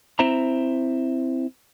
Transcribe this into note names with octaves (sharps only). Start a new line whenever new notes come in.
C4 E4 C5 E5 A#5